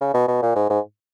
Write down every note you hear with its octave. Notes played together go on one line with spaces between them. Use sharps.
C#3
B2
B2
A#2
G#2
G#2